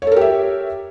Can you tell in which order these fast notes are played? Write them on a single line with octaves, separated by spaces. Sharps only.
C#5 A4 A#4 G4 E5